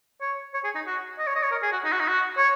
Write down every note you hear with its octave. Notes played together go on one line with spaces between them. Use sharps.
C#5
C#5
G#4
D#4
F#4
D#5
C#5
D#5
C#5
A#4
G#4
F#4
D#4
F#4
D#4
F#4
C#5